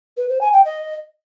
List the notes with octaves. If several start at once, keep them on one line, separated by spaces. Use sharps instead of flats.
B4
C5
G#5
G5
D#5